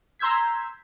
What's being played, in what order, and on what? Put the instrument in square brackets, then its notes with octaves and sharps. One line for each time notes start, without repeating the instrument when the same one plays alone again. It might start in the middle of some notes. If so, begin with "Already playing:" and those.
[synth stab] A#5 C6 E6 G6 G#6 B6